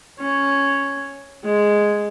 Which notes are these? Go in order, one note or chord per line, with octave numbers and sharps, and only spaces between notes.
C#4
G#3